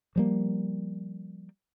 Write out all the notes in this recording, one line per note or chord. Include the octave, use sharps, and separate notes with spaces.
F3 G3 A#3